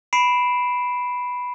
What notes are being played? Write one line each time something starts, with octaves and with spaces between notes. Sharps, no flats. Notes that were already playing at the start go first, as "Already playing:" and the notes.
B5 C7 D7 E7